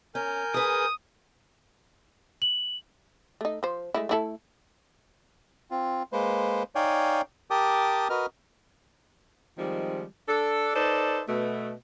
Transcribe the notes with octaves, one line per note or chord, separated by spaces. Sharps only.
C#4 A#4 G#5 G6
G#4 B4 D#6
F#7
A3 D#4
F3 C5
G#3 A3 E4
A3 E4 A4
C4 F4
G#3 A#3 B4 C5
D#4 C#5 D5 F5 G5 G#5
G4 A#4 G5 A5 D6 D#6
F#4 A#4 B4 D#5 F6
D#3 F3 G3 G#3 C4
D4 A4
D#4 A4 B4 C5 D5
B2 A3